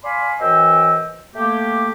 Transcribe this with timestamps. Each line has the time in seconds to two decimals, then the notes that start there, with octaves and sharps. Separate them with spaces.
0.04 D5 F5 G#5 B5 C6
0.41 F#2 E3 C5 D#5 G5 E6
1.35 A3 A#3 G4